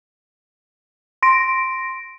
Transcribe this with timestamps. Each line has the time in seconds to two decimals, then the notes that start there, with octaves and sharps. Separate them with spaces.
1.23 C6 A#6 D7